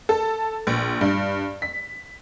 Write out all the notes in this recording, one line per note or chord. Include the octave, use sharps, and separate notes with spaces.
A4
A#1
G2
B6